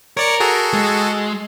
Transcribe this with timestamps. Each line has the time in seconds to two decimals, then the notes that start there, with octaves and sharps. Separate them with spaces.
0.17 A#4 C#5 D5 C#7
0.40 F#4 G#4 A4
0.73 G#3